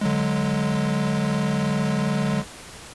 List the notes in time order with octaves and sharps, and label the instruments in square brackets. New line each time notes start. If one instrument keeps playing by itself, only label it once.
[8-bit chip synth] D3 F#3 G#3